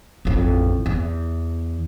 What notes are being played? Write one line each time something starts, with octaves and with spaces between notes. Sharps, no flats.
A1 F2
E2